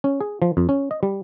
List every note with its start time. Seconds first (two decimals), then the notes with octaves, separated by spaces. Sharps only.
0.04 C#4
0.21 G#4
0.42 F3
0.57 F2
0.69 C#4
0.91 D#5
1.03 G3